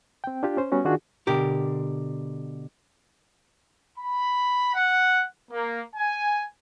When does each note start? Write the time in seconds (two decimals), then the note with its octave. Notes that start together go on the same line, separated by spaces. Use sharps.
0.24 C4 G5
0.43 D4 F4 G4
0.57 C#4 C5
0.72 G3 B3 C#4 F#4
0.85 D#3 D4 F4 F#4 G#4
1.27 B2 D3 G4 A#4
3.99 B5
4.75 F#5
5.52 A#3
5.96 G#5